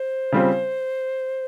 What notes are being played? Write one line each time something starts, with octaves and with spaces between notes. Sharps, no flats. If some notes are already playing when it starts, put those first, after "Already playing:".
Already playing: C5
C#3 G3 C4 F4